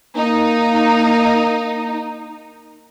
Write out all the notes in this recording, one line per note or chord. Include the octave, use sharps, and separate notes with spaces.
A#3 D#4